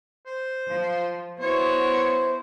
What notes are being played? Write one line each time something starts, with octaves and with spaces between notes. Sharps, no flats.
C5
F3
B3 E4 F#4 C5 C#5